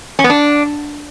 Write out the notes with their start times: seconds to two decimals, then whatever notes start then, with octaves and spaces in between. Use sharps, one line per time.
0.19 C#4
0.24 B3
0.30 D4